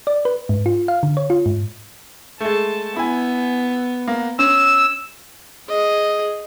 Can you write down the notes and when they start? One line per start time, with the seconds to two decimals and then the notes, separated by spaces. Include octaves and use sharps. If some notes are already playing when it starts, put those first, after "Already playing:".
0.07 D5
0.25 B4
0.49 G#2
0.66 F4
0.88 F5
1.03 D3
1.17 C#5
1.30 F4
1.46 G#2
2.40 G#3 A3 A5
2.96 B3 E4 G#5
4.08 A#3
4.39 C#4 E6
5.69 G#4 D#5